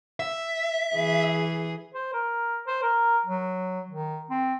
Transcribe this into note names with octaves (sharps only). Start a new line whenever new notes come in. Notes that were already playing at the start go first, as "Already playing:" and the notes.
E5
E3 G#4
C5
A#4
C5
A#4
F#3
D#3
C4